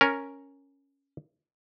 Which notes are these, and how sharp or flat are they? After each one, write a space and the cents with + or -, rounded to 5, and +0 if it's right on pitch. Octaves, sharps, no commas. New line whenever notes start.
C#4 +0 A#4 +0